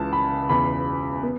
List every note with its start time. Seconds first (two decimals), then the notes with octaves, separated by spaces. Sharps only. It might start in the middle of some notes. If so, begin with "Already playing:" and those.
Already playing: C#2 C#3 E3 A5
0.13 B5
0.49 E1 E2 C#3 B5
1.23 B3